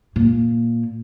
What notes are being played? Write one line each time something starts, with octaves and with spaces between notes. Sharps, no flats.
A#2